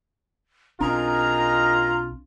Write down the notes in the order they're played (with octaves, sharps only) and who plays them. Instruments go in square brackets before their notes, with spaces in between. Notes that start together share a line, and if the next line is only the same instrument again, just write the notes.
[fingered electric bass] B1 C4 D4 [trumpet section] D#4 G#4 A#4 [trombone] F4 [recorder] A#5